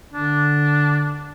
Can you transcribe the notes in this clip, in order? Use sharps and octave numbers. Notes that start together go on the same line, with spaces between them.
D3 D4